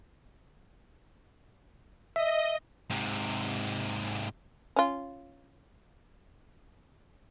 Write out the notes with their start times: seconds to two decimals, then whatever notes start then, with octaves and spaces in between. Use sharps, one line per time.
2.16 D#5 E5
2.90 G#2 C3
4.76 C#4 F4